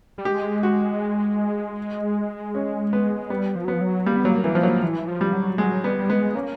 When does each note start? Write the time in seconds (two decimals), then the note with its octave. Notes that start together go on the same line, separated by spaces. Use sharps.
0.18 G3
0.25 G#3 G4
0.63 F#4
2.55 C#4
2.93 B3
3.30 G3 B3
3.55 F3
3.65 F#3
3.68 F3 B3
3.81 F#3
4.06 G3 A#3
4.16 B3
4.25 F#3 A#3
4.44 E3 A#3
4.55 F3
4.63 F#3
4.83 E3
5.08 F3
5.21 G3
5.33 F#3
5.58 F#3 G#3
5.84 G3 B3
5.99 G3
6.09 G#3 B3
6.35 A#3 C#4